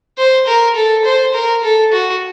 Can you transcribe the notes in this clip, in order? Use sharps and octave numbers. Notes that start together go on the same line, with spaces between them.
C5
A#4
A4
C5
A#4
A4
F#4